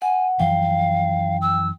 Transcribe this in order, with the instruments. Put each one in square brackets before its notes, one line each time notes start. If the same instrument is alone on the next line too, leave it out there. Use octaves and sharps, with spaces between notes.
[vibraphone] F#5 [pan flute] G#5
[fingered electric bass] F#2 E3 F3 [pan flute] F5 [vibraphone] G5
[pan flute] E6